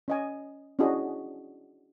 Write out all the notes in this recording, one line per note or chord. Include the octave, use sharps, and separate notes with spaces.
C#4 D#5 G#5
C#4 D4 E4 F#4 G#4 D#5